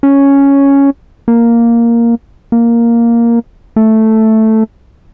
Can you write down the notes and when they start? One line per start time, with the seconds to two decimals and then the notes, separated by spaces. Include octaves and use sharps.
0.03 C#4
1.28 A#3
2.52 A#3
3.76 A3